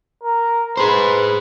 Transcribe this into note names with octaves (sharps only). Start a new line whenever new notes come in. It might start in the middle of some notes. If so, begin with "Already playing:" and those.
A#4
G#4 B4 C5